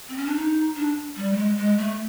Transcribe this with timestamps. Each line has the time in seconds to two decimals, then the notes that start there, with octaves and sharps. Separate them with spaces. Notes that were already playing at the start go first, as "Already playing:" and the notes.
0.09 C4
0.17 C#4
0.26 D4
0.35 D#4
0.76 D4
1.16 G3
1.33 A3
1.36 G#3
1.57 G#3
1.78 A3